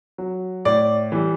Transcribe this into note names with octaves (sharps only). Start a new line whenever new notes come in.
F#3
A2 D5
E3 G3